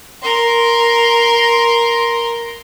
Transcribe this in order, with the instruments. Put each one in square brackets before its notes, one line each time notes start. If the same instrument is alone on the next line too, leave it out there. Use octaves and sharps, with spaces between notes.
[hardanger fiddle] A#4 C6